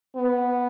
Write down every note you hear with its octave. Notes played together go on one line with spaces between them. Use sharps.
B3